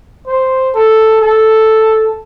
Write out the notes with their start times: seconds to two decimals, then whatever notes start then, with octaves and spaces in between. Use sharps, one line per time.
0.27 C5
0.75 A4
1.21 A4